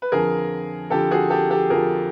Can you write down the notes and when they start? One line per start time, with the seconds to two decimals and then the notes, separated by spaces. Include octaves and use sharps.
0.02 B4
0.12 F2 D3 F3 G#4 A#4
0.90 F2 D3 F3 G4 A4
1.11 F#4 G#4
1.30 G4 A4
1.50 G4 A4
1.70 F2 D3 F3 G#4 A#4